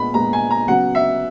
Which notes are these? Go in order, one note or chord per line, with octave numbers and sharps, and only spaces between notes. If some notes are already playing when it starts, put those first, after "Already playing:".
Already playing: A#2 G#3 B3 B5
A#2 G#3 B3 A#5
G#5
A#5
C#3 F#3 B3 F#5
E5